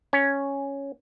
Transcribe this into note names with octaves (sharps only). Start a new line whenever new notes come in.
C#4